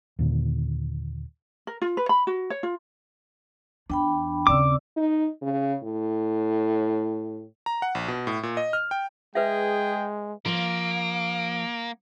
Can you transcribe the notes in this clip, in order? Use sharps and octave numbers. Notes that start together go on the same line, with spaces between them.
D#2 A#2 D3
A#4
F4
B4
B5
F#4
C#5
F4
E2 D4 G5 B5
D#2 C#3 C4 D5 D6 E6
D#4
C#3
A2
A#5
F#5
A#1
B2
A2
A#2
D#5
F6
G5
G#3 G#4 B4 E5 G5
F3 A#3 D7